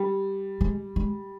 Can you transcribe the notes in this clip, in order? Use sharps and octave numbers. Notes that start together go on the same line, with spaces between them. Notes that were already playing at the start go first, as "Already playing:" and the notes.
Already playing: G3
G#3
G#3